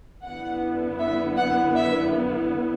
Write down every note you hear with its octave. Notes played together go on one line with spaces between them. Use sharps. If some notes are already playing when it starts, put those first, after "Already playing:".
F#2 D3 B3 E4 F#5
E5
F#5
E5